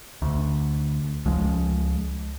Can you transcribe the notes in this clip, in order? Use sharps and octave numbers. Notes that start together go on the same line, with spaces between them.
D2
C#2 F3 G#3